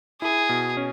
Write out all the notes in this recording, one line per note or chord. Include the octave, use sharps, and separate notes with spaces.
E4 G#4
B2
C#4